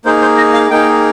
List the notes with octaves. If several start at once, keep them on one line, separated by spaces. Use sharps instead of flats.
A#3 D#4 G#4 C5
C5
D#5
F5
A#3 D#4 G#4 G5